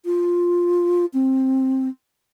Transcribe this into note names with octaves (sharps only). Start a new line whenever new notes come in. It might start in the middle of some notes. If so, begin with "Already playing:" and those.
F4
C4